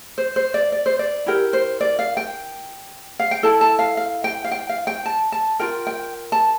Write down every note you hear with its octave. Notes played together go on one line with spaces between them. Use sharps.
C5
C5
D5
D5
C5
D5
E4 G4 A#4
C5
D5
F5
G5
F5
G5
E4 A4 A5
A5
F5
F5
G5
F5
G5
F5
G5
A5
A5
F4 A#4 G5
G5
A5